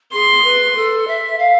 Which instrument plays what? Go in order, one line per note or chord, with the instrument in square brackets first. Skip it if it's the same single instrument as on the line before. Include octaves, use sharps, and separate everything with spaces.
[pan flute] G#4 [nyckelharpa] C6
[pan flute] B4
A4
E5
F5